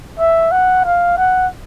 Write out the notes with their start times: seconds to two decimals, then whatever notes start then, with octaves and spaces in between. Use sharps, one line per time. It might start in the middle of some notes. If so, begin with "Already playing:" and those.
0.19 E5
0.51 F#5
0.85 F5
1.18 F#5